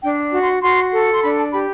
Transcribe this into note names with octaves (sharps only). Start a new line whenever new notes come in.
D4 G5
F#4
C6
F#4 C6
A4
C6
D4 B5
A5
G4 B5